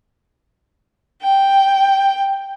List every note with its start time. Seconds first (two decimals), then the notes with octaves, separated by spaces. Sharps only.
1.23 G5